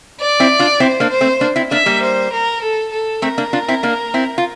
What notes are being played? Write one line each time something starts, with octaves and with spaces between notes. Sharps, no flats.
D5
C4 E4
D4 F4
C4 E4 C5
A#3 D4
C5
A3 C4
A#3 D4
C4 E4
A#3 D4 E5
G3 A#3
C5
A#4
A4
A4
A3 C4 A#4
A#3 D4
D4 F4
C4 E4
A#3 D4
C4 E4
F4